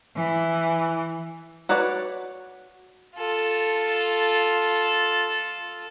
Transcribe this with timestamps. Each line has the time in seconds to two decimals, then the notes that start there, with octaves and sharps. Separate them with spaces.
0.16 E3
1.69 F#4 B4 C#5 D5 F#5
3.17 F4 A4